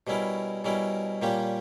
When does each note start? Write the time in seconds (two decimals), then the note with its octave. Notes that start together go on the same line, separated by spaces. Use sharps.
0.07 B2 G3 C#4 E4 A#4
0.64 B2 G3 C#4 E4 A#4
1.22 A#2 G3 A#3 C#4 G4